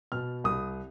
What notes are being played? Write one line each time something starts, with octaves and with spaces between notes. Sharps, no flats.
B2 F6
C2 D#6